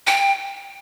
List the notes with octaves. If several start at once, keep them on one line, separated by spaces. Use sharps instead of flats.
G5